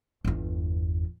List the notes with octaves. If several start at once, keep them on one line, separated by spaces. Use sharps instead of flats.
G1 E2